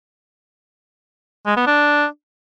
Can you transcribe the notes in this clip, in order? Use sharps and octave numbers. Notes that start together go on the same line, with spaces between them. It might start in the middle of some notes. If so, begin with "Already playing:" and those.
G#3
B3
D4